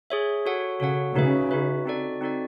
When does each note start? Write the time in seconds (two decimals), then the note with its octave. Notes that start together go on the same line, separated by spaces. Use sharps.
0.10 G#4 C#5 E5
0.46 F#4 A4 C#5 F#5
0.80 C#3 F#4 A4 C#5 F#5
1.15 C#3 D#4 F#4 B4 E5
1.51 D#4 F#4 B4 E5
1.85 C4 D#4 F#4 A4 D5
2.21 C4 D#4 F#4 A4 D5